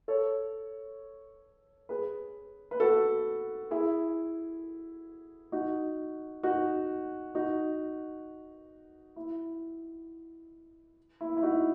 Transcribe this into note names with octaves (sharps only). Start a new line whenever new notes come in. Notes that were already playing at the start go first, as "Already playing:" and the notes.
A4 C#5
G#4 B4
B4
F#4 A4
E4 G#4
D#4 F#4
D#4 F#4
D#4 F#4
E4
E4
E4
D#4 F#4